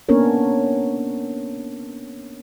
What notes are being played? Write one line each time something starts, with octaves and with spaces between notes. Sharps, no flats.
A#3 B3 C#4 D4 A#4 C#5